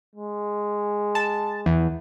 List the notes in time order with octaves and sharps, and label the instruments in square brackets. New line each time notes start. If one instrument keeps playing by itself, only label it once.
[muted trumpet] G#3
[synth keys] A5
E2